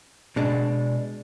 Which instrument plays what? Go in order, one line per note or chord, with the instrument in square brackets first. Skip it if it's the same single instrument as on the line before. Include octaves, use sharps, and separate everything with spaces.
[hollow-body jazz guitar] B2 G#3 D4